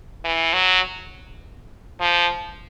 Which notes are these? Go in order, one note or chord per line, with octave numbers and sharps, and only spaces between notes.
E3
F#3
F3